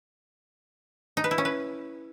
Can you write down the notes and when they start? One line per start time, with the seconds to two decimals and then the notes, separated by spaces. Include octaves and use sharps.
1.17 D#4
1.24 B4
1.31 E4
1.38 C#4
1.45 B4